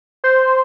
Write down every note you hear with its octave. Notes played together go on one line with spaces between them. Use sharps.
C5